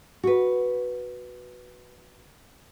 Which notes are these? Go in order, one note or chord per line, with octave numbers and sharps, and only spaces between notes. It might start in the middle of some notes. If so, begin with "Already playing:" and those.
F#4 B4